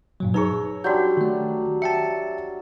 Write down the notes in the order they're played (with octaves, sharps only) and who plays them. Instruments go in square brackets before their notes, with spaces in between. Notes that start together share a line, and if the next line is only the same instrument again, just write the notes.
[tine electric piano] G2 A#2 F#3
[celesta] D#4 G#4 [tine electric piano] B4 A#5 [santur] C#5 E6
[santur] F#3 G3 D4 [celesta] F#4 D5 G6
[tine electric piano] D#3 A3
[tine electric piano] E5 G5 A5 [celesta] C#7